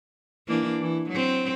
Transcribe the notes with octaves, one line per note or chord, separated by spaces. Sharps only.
E3 A#3 D4
E3
F#3 C4